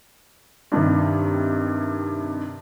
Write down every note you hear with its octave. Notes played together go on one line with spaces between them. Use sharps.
G2 C3 D#3